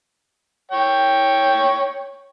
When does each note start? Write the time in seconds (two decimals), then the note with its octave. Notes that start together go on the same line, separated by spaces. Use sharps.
0.72 C#5 G5